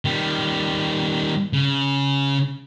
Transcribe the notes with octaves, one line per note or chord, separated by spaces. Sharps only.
D#3 G3
C#3